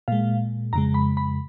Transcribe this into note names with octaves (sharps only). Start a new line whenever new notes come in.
A#2 G#3 F5
F2 C#3 G#3 A#5
B5
B5